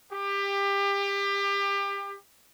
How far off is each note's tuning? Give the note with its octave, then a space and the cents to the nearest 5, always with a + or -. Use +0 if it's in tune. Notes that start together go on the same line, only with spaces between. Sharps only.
G4 +25